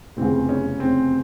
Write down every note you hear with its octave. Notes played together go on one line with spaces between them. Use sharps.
F1 E2 C#3 C4
C#4
C4